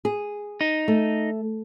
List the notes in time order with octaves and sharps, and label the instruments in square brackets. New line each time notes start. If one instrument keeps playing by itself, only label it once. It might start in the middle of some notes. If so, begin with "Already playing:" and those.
[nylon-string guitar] G#4
[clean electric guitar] D#4
[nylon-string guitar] A3